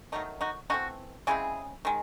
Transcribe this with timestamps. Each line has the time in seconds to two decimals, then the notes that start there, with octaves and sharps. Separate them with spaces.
0.12 D#3 F#3 A3 D#4
0.41 D#4 F#4
0.70 E3 A3 C4 D#4 F#4
1.27 C#3 G#3 C4 E4 G#4
1.85 D#3 G#3